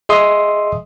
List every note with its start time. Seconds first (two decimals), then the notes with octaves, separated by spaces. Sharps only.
0.09 G#4 D#5 E5 C6 D#6